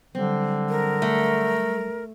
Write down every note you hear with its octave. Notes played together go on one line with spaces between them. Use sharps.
D3 F#3 G3 C4
A#4
A3